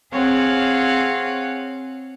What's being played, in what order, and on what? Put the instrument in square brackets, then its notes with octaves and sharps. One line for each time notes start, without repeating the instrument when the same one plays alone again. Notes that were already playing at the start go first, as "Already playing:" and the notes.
[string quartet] C4 G#4 C#5 F5 F#5